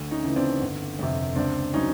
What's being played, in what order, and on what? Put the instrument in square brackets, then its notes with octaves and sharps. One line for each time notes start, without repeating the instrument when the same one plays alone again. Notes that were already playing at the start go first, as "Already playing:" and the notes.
Already playing: [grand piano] D2
C#4 D#4
C#3 E3
C4 D4
G1
F2 C3
C#2 C4 D4
C#3 F#3 C#4 D#4